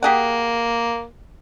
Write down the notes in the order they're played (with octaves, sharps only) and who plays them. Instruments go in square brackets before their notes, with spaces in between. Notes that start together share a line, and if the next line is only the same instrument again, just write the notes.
[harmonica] A#3 [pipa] G4 G#4 F#5